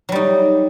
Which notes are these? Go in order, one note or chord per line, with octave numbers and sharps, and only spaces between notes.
F#3 G3 D#4